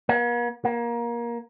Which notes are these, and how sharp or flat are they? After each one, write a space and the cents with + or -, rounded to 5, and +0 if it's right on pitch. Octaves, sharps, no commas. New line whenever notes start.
A#3 +45
A#3 +20